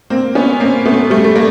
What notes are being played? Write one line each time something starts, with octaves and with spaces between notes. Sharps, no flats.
A#3 C4
B3 C#4
A#3 C4
A3 B3
G3 A3
A3
A#3